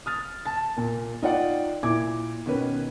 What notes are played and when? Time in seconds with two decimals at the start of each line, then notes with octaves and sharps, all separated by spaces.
0.06 D#6 F6 A6
0.46 A5 A6
0.77 A#2 A#3
1.22 D#4 F4 D5 F#5 G5
1.83 A#2 E4 D6 G#6
2.46 B2 D#3 C#4 B4